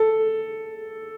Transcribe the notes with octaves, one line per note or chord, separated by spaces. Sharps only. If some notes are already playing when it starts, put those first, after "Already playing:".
Already playing: A4